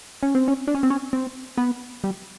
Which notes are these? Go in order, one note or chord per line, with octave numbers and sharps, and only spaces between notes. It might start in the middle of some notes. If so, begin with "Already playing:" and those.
C#4
C4
C#4
D4
C#4
C4
C#4
C4
B3
G3